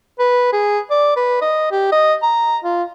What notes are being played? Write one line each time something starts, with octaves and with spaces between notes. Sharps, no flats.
B4
G#4
D5
B4
D#5
G4
D#5
A#5
F4